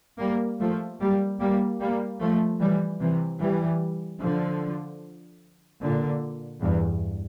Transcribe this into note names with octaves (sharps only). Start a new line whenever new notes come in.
G3 A#3
F3 A3
G3 A#3
G3 A#3
G3 A#3
F3 A3
E3 G3
C3 E3
E3 G3
D3 F3
A#2 D3
E2 G2